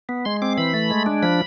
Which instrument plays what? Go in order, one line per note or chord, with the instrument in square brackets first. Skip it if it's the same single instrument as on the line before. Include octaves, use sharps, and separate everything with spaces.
[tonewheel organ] B3
G#3 C6
C4 D6
E3 B5
A3
G#3
D4
F3 B5